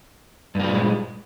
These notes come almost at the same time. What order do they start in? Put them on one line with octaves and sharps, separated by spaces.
G2 A#3 G3 A#2 G#3